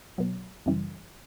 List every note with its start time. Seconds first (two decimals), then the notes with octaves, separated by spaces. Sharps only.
0.18 B2 F#3
0.66 F#2 C#3 E3 G3